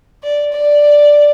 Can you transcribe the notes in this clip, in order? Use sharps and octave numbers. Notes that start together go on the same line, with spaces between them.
D5
D5